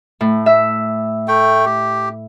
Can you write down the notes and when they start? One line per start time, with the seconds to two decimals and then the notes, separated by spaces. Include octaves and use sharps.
0.21 A2
0.46 E5
1.28 A3 G5
1.65 G4